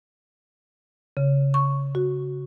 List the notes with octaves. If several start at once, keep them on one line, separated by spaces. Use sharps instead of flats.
C#3
C#6
F#4